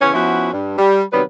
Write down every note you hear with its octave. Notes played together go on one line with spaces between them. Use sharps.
C#3 E3 B3 C#4
F3 B3 C#4 E4 F#4
G2
G3
C3 D#3 F#3 G3 B3 B4